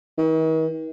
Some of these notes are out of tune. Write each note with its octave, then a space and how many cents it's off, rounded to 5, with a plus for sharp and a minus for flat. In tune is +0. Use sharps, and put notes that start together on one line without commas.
D#3 +45